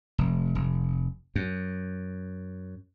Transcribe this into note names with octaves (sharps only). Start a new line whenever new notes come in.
F1
F1
F#2